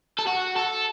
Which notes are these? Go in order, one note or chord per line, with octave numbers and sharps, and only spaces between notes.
A4
F#4
A4